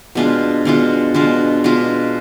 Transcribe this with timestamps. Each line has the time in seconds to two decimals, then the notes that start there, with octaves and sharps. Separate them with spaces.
0.15 B2 G#3 D4 F4
0.65 B2 G#3 D4 F4
1.14 B2 G#3 D4 F4
1.64 B2 G#3 D4 F4